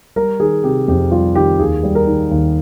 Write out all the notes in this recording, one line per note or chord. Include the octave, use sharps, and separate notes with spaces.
G3 A#4
D#3 G#4
C3 G4
F2 G4
G3 F4
D#3 G4
D#2 G#4
G3
A#4
D#3
D#2